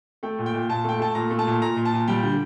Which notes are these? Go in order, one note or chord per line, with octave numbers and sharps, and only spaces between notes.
A3 G5
A#2
G5
A#2
A#2 A5
A3 G5
A3 A5
A#2 A#5
A3
A5
A#2
A#2 A#5
A#2
A5
A#2
G3 G5
D3